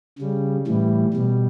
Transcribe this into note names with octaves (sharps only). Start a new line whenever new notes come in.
C#3 G3
A2 E3 G3
B2 G3